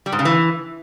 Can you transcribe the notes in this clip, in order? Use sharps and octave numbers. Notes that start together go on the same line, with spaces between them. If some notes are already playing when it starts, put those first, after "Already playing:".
G3
G#2
C#3
E3